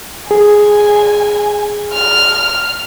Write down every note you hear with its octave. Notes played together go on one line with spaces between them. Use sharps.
G#4 G#5
F6